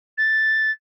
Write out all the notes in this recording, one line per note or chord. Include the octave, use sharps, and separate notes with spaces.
A6